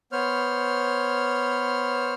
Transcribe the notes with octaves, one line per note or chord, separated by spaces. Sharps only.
B3 C5 C#5 F6